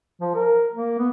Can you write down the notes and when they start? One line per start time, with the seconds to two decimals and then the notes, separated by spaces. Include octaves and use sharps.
0.21 F3
0.35 A#4
0.74 A#3
0.98 B3